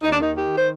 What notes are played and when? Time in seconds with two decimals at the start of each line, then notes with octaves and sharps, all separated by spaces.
0.02 D#2 D#4
0.12 D4
0.19 D#3 D#4
0.35 D#3 G4
0.56 C5